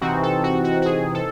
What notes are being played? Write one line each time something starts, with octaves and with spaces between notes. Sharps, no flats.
C3 E3 C4 D#4 F#4
A4
F#4
F#4
F#4
G#4
A4